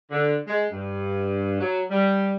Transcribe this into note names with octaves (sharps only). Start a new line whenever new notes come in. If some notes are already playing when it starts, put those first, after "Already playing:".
D3
G#3
G2
F#3
G3